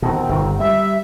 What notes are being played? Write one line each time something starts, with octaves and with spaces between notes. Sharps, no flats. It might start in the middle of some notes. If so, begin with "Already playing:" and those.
B2 D#3 C4
G1 D#3
G3 E5